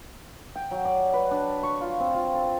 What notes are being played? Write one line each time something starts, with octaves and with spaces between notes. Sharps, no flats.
G5
F#3
D5
B4
D4
C#6
F4
C4
F4
A4